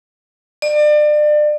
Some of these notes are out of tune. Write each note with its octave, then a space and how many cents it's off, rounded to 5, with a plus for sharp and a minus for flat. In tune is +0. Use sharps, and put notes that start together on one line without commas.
D5 +35